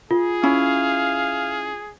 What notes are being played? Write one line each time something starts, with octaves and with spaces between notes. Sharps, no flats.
F4 G#4
C#4 E4 F5